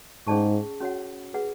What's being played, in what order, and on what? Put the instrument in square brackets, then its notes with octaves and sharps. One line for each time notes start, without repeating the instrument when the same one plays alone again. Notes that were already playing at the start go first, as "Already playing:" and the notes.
[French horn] G#2 [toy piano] C#4 G#4 D5 A5 C#6
[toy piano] C#4 F#4 C#5 F#5
G#4 B4 F#5